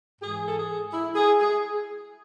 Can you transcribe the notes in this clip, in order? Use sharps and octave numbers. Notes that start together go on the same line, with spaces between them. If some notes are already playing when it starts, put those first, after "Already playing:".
G#2 E3 G#4
A4
G#4
E4
G#4
G#4